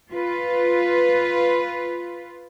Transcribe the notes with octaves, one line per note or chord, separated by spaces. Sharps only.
F4 B4